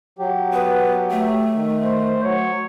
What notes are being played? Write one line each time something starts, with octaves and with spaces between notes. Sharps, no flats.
F#3 G4
B3 B4
A3 E5
D#3
C5
F#3 C#5